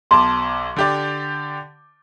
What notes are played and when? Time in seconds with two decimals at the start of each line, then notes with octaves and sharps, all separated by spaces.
0.11 B1 A5 C6 D6
0.77 D3 G4 D5